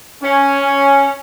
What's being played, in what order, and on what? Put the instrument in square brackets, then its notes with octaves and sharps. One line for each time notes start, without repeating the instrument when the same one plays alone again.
[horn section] C#4